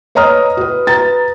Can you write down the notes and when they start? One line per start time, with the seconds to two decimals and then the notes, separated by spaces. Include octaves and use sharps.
0.15 B4 C#5 D#5 A#5 D#6 F6
0.57 F#4 B4
0.87 B4 A#5 A6